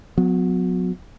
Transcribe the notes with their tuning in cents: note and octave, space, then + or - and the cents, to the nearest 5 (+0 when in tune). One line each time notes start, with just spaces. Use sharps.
F#3 -25 B3 +30